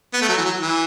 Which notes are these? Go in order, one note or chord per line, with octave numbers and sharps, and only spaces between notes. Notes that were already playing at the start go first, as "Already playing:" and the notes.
B3
A3
F#3
E3
F#3
E3